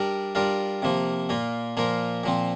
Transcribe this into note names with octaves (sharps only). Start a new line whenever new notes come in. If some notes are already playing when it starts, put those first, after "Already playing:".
Already playing: G3 D4 A#4
G3 D4 F4 A#4
C3 F3 A#3
A#2 A#3 F4
A#2 F3 A#3 F4 A#4
A#2 F3 C4